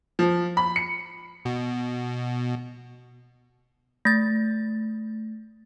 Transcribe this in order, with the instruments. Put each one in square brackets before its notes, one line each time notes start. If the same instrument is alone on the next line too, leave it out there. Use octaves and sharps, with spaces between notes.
[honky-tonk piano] F3
B5
C#7
[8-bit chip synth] B2
[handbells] A3 A6